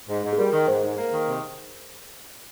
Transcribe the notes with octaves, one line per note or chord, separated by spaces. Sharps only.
G#2
G#2
G#4
G3 A#4
D#3
G#2 C5
G#2
A#3
D#3
C3